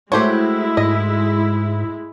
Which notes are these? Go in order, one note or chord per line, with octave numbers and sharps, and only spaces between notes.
G#3 A3 E4 F#4 G4 C5 C#5
G#2 D#5